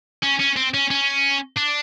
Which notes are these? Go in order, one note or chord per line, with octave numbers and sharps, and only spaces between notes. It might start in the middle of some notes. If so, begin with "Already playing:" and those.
C#4
C#4
C4
C#4
C#4
D4